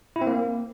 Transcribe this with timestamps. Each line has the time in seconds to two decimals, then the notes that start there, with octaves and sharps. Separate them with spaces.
0.16 E4
0.21 C4
0.27 A#3